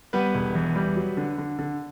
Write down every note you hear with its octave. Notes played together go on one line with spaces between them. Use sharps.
G3 B3 B4
E1
E2
G3
F#3
D3
D3
D3